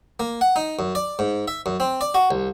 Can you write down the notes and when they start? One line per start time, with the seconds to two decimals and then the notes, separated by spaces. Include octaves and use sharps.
0.20 A#3
0.41 F#5
0.56 D#4
0.79 F#2
0.95 D5
1.19 G#2
1.48 E5
1.66 F#2
1.80 C4
2.01 D5
2.14 F#4
2.31 C2